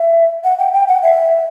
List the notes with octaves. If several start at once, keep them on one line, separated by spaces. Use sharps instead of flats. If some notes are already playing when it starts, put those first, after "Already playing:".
Already playing: E5
F#5
G5
G5
F#5
E5